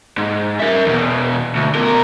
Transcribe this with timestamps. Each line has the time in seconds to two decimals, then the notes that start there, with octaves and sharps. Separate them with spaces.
0.17 G#2
0.60 A#4 E5
0.86 E2 B2
1.56 D2
1.75 B2 A#4